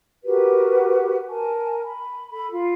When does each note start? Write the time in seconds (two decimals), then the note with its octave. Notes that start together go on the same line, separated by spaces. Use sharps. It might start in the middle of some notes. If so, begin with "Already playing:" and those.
0.24 F#4 G4 A#4 B4
1.28 A#4 G#5 A5
1.83 B5
2.30 A4 B5
2.50 F4